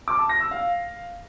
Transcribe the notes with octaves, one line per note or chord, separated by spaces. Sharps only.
D6
A5
A#6
E6
F5